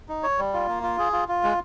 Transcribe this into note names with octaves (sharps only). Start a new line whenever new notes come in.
D#4
C#5
G3
F4
A#3
F4
G#4
F4
F4
G#3